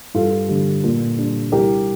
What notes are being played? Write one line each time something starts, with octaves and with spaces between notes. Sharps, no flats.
G2 F4 A4
D3 G3
A#2
G3 D4
C2 G4 A#4